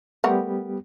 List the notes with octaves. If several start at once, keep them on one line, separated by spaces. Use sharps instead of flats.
G3 A3 B3 G4 A#4 F#5